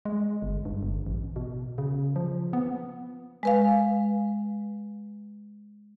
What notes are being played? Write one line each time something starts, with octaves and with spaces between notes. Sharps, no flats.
G#3
G1
G2
G1
A1
B2
C#3
F3
B3
G#3 B4 F5